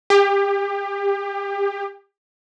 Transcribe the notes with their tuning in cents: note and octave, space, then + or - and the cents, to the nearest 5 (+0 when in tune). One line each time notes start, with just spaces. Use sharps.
G4 +30